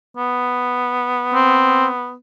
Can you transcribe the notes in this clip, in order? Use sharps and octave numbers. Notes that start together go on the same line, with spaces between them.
B3
C4